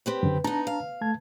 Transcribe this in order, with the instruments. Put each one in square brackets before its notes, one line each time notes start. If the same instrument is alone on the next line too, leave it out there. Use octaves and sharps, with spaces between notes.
[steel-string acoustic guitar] C4 G4 B4
[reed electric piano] F#2 D3
[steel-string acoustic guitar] B3 D#4 [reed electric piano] D4 A5 A#5
[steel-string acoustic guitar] F5
[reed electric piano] A3 A5 G#6